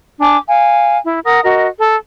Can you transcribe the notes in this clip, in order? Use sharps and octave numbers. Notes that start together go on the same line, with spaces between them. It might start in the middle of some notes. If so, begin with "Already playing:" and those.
D4 G#5 A5 D6
F5 G#5
E4
A#4 F#5 D#6
F#4 A#4 D#5
A4